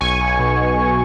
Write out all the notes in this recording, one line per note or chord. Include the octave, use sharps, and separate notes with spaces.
B1 G#5 C#6
B1
B2